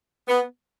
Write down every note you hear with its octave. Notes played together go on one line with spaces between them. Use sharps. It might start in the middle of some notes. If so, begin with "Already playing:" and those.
B3